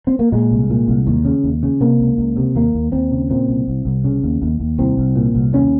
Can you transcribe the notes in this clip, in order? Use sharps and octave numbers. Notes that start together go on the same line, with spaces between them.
C4
A#3
A#2 G#3
C2
A#2
C2
D#2
C#3
D#2
C#3
C3 A#3
C#2
C#2
C3
D#2 A#3
D#2
D#2 C4
C#3
A#2 C4
C2
C2
C2
C#3
D#2
D#2
D#2
C2 C4
C2
A#2
C2
D#2 C#4